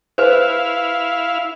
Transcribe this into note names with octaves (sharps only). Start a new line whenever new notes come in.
E4 B4 C5 F5